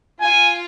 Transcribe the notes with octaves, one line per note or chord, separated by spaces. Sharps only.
F4 G#5